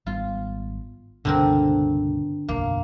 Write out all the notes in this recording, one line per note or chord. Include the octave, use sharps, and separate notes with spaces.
G#1 G3 B3 F4
C#2 G2 B2 D3 C4 A#4
F#1 B1 E2 A#3